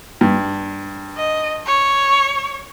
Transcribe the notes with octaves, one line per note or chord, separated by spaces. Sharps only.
G2
D#5
C#5